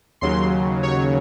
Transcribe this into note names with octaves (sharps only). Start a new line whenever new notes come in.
D#2 C#3 F#3 C6
C#5